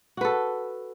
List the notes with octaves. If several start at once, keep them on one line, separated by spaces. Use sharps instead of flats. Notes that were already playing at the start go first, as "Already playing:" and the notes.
F#4 A4 B4